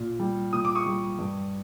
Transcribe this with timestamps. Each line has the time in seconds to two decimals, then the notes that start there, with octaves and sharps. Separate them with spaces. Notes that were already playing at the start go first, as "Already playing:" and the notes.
Already playing: A#2
0.20 G3
0.53 A#2 D#6
0.65 D6
0.75 C#6 D#6
0.86 G3
1.19 G2